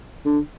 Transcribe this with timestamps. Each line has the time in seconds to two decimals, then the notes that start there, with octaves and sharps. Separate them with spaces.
0.25 D3